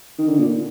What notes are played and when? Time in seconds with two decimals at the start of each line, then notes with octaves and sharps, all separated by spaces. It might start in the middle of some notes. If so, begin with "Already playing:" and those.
0.18 D#3
0.28 D3
0.39 A#2